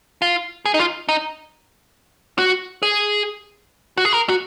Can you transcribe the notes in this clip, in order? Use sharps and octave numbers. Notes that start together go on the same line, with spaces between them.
F4
G#4
D#4
F4
D#4
F#4
G#4
F#4
G#4
A#4
F#4